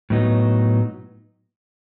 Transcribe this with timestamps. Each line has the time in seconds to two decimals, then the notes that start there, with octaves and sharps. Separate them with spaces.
0.10 A2 F#3 B3 D#4